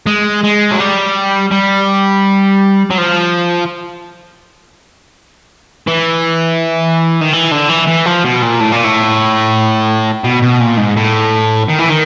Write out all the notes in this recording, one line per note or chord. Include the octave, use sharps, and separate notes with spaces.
G#3
G#3
F#3
G3
G3
F#3
F3
E3
D#3
E3
D3
E3
E3
F3
B2
A#2
A2
A#2
A2
B2
B2
A#2
G#2
A2
D#3
E3
D#3